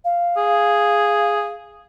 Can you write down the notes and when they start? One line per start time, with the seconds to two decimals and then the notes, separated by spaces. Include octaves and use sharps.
0.05 F5
0.37 G#4